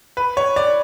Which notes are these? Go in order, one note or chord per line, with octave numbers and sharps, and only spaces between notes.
B4
C#5
D5